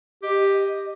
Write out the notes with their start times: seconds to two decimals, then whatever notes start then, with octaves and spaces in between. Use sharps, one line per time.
0.23 G4 D#5